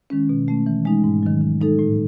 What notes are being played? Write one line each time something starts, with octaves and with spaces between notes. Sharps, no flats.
D#3 G#3 C#4
B2
A3 C#4
E3
G#3 D#4
G#2
D#3 F#3
D#3
G#3 D#4 A4
A2